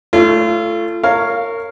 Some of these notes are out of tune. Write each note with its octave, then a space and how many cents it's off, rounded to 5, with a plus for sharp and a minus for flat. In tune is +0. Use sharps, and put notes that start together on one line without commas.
A3 +0 F4 -30 C#5 +0
A#4 -25 C#5 +0 F5 +0